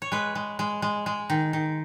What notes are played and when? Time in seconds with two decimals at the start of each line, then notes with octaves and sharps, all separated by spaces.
0.02 C#5
0.12 G#3 B4
0.35 G#3
0.59 G#3
0.82 G#3
1.06 G#3
1.30 D#3
1.53 D#3